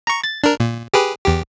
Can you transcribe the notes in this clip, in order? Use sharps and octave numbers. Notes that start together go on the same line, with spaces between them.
A#5 C#6
A6
D4 A#4
A#2
G4 G#4 B4
E2 G4